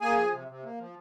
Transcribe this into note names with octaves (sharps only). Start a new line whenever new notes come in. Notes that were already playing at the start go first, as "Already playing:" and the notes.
A#3 G#4 G#5
F3
C3
C3
A#3
F3